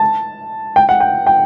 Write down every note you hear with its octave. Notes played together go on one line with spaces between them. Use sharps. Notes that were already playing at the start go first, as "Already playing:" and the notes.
Already playing: A5
G5
F#5
G5
G5